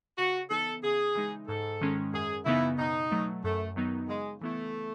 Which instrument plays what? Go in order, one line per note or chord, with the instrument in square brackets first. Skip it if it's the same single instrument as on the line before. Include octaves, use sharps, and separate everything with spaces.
[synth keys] C#3 [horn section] F#4
[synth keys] E3 B3 D#4 [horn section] A4
[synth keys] C#3 [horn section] G#4
[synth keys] E3 G#3 D#4
[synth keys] G#2 [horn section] A4
[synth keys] D#3 G#3 C#4
[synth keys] F#2 [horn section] G#4
[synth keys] C#3 E3 B3 D#4 [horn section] E4
[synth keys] B2 [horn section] D#4
[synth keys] F#3 A3
[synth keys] F#2 [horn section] A3
[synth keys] D#3 F#3 B3 D#4
[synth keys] C#3 [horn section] G#3
[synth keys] E3 B3 E4 [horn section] A3